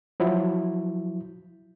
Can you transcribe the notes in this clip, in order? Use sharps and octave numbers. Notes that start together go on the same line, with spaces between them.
F3 F#3 E4